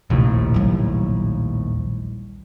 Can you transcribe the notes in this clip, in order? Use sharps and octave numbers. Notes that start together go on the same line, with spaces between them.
A#1 D#2 A2 C3
F#3 G3